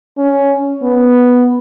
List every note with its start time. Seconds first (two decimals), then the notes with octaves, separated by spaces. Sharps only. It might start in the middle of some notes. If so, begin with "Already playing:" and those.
0.17 C#4
0.82 B3